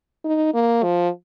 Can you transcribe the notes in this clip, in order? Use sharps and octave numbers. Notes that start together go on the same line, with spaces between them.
D#4
A#3
F3